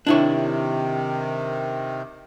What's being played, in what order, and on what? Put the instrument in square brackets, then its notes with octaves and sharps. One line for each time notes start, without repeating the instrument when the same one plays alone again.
[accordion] C3 D#3 [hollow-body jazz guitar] D4 E4 C#5